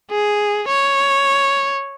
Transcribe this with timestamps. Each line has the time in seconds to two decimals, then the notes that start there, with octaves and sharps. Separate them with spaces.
0.11 G#4
0.68 C#5